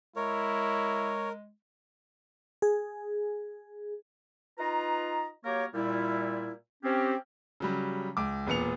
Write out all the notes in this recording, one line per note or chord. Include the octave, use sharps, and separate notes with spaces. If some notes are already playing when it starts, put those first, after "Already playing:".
G#3 E4 A#4 C#5
G#4
D#4 F4 B4 A#5
F#3 A#3 G4 A#4 C#5
A#2 G3 E4
C4 C#4 G4
C#3 F#3 G3
C#2 D6
E1 A#2 B3 C#7 F7